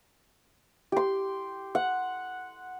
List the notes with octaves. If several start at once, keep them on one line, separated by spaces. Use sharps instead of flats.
G4 C6
F#5